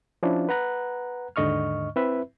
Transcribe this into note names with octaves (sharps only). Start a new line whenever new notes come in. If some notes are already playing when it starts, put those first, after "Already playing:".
F3 C#4 D4 E4
B4 F#5 A#5 F#6
D#2 G#2 D3 D#5 C#6 F6
C4 E4 B4 E5